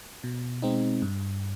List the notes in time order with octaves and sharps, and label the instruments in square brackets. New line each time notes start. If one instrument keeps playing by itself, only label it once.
[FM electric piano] B2
G#3 C4 D#4
G2